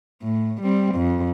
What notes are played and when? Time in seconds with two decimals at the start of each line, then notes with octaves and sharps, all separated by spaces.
0.23 A2
0.62 G3 C4
0.95 F2